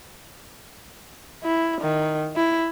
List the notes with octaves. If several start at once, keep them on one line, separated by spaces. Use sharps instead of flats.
E4
D#3
E4